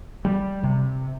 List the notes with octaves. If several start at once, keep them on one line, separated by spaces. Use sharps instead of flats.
G3
C3